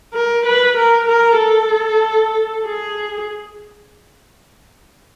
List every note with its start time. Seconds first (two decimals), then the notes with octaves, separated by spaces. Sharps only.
0.13 A#4
0.45 B4
0.77 A#4
1.08 A#4
1.39 A4
2.65 G#4